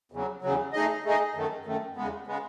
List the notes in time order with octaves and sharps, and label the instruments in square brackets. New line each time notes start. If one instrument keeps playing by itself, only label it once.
[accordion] E2 C#3 F#3
E2 C#3 F#3
A3 D#4 G#4 D#5
A3 D#4 G#4 D#5
F#2 D#3 A3
F#2 D#3 A3
E2 C#3 G#3 B3
C#3 G#3 B3